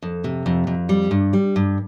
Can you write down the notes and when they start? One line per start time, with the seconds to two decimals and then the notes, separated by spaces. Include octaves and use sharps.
0.02 F2
0.24 C3
0.46 F2
0.67 F2
0.89 G3
1.11 G2
1.33 G3
1.56 G2